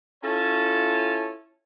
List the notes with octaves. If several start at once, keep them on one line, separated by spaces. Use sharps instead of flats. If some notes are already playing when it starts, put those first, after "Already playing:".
C#4 E4 F4 A4 C#5 A5